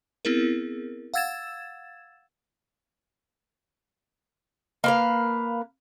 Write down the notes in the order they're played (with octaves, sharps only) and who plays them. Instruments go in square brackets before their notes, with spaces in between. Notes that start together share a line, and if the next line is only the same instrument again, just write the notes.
[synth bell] B3 C4 E4 G#4 A#4
F5 F#5 E6 G#6 A6 E7
[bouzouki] A#3 B4 F5